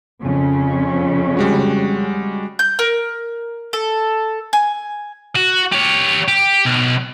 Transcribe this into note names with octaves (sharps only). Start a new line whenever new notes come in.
F2 C#3 C#4
G3 G#3 F#4
G6
A#4
A4
G#5
F#4
G4 C#5
G4
B1